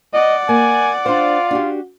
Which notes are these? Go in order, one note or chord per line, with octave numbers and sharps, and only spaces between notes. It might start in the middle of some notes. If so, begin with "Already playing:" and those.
D5 D#5 F#5
A#3 G#5
D4 F4 C5
D4 F#4 G4